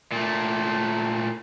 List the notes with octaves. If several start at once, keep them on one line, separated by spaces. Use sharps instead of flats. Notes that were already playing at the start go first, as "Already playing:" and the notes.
A#2 A3